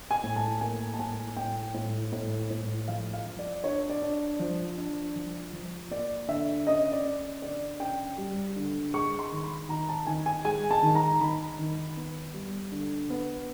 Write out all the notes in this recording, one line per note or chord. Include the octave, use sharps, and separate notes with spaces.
G#5
A2
A5
A#3 G#5
A5
A2 G#5
A2 G5
A2
A2
A2
F3 F5
F5
F3
D5
D4 C#5
D5
D4
F3
D4
F3
F3
A#3 D5
D3 E5
C#4 D#5
D5
C#4
D3 D5
C#4 G5
G3
D3
G#3 C#6
C6
D#3
B5
D#3 A#5
A5
D#3 G#5
G#5
G#3 G#5
A5
D#3
A#5
D#3 B5
D#3
B3
G3
D3
B3